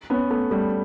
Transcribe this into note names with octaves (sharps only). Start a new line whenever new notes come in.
B3 C#4
A3 B3
G3 A3